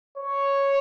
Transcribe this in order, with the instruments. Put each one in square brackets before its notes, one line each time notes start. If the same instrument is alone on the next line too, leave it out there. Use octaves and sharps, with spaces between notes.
[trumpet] C#5